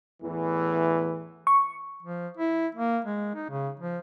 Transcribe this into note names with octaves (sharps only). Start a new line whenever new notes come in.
E2 A2 E3
C#6
F3
E4
A#3
G#3
D#4
C#3
F3